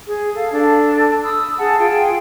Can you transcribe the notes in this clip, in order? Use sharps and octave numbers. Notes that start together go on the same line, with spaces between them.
G#4
A4 F5
D4 A4
B5 D#6 E6
G#4 F#5 A5
F4 G#4 G5